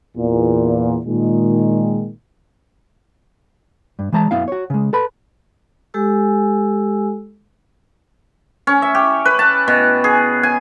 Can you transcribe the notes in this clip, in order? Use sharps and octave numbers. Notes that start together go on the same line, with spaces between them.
E2 A#2
A#2 D#3 G#3
G2
E3 G#3 A5 A#5
F#2 B3 E4 F5
F#4 C#5
C#3 G#3
A4 B4 B5
G#3 G4 A4 G#5 E6
C#4
E5
G4
B4
A5
B2
G#4
G#5